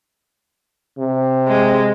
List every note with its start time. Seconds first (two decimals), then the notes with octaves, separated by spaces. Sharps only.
0.98 C3
1.48 G#3